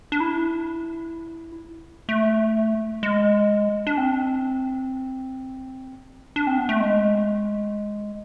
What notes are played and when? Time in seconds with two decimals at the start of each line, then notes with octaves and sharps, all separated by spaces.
0.12 D4
0.20 E4
2.09 A3
3.03 G#3
3.87 D4
3.98 C4
6.36 D4
6.47 C4
6.58 B3
6.69 A3
6.80 G#3